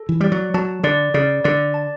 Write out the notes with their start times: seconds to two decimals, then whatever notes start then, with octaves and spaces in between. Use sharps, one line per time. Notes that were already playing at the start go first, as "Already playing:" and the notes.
Already playing: A4
0.09 E3
0.21 G3 D5
0.32 F#3
0.54 F#3 A5
0.83 D3 D5
1.14 C#3 D5
1.44 D3 D5
1.74 A5